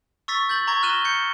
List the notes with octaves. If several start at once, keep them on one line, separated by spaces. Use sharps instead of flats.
C#6 E6 A6 B6
G6 A6 F#7
A#5 C#6 G#6 A#6
F6 F#6 A#6 D#7 E7 G7
G6 C#7